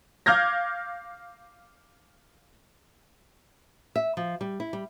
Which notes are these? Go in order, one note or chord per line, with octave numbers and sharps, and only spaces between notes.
F5 D6 F6 G6 G#6 A#6
E5
F3
G3
E4
G3